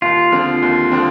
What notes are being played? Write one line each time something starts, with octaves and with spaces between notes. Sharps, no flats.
D#2 F4
D3 F3 C4
D#2
D3 F3 C4